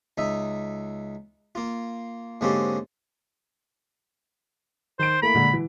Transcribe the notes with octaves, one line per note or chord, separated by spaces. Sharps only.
C#2 D#4 E5
A#3 F4
G#2 D3 A#3 C4 C#4 G4
D#3 C5 D7
A3 A#3 E4 B5
A#2 D3 G#3
E3